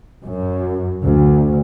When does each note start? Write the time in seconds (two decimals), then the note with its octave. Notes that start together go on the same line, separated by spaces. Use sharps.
0.23 F#2
1.07 D2